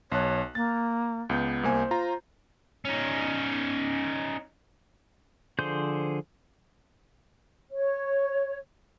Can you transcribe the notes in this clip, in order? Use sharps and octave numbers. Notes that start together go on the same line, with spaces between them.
B1 C#5 A5 F#6
A#3 A6
C#2 B3 G6
C2 A#3 C5 G#5
F4 A#5
C#4 D#4
D3 F3 G#4 C5 G6
C#5